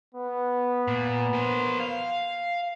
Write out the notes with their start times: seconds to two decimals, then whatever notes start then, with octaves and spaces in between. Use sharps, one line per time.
0.15 B3
0.88 A#2
1.34 A#4 C5
1.80 F5